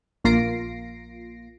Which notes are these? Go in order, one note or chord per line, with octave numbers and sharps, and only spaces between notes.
A#1 A#3 F4 A#6 C7 D7